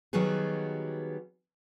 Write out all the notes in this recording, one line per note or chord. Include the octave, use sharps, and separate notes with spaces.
D#3 F#3 G3 B3 F#4 G#4